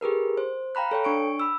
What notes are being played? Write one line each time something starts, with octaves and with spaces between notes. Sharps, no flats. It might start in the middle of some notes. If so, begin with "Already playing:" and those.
G4 G#4 A#4 B4
C5
F5 G5 A#5 B5 F#6
A4 C#5 G5
D4 C#6 D7
B5 E6